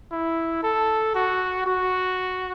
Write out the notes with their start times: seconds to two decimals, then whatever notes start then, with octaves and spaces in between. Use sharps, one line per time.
0.12 E4
0.63 A4
1.15 F#4
1.66 F#4